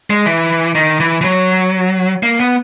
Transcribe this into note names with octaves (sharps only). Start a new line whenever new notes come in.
G#3
E3
D#3
E3
E3
F#3
A#3
B3